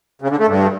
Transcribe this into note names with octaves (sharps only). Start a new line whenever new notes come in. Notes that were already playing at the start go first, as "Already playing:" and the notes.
C#3
D3
A3
G2